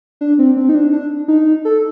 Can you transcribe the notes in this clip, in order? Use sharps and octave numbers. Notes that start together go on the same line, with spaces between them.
D4
C4
C4
D#4
D4
D4
D#4
A4